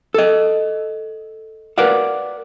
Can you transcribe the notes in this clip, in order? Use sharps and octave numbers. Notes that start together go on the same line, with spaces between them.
A4 D#5
A#4 B4 D5 F5 F#5